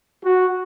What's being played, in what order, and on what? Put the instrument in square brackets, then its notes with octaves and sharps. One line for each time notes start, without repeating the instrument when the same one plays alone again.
[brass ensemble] F#4